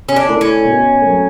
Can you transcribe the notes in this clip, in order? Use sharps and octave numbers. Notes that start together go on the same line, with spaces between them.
C#4
D4
A3 E4
C#4
B2
F#3 A3